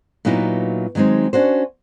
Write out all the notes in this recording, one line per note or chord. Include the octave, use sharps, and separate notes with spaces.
A#2 F#3 B3 D#4 E4
D#3 F#3 G#3 C4 D#4
C#4 D4 F#4 C5